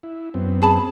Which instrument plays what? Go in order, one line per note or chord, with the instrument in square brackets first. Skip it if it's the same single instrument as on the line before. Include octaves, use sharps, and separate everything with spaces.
[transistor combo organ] E4
F#2 B3 C4
[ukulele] G#4 A5 B5